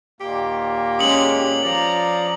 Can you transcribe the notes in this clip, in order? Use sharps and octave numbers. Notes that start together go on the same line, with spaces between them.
D#2 A#2 A#3 G4
G#3 C#4 D#6 C#7 F#7
F3 D5 A#5